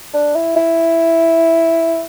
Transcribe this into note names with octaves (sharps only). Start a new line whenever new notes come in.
D4
E4
E4